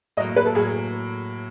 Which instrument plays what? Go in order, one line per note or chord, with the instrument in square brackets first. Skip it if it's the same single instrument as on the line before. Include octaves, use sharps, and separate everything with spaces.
[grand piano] A2 F#3 A#3 [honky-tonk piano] D#5
[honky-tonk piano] B4
A4
[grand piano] A2 F#3 A#3 [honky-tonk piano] G#4